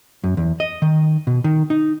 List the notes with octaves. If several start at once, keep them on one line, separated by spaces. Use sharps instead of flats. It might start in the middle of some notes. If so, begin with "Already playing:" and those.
F#2
E2
D#5
D#3
B2
D#3
D#4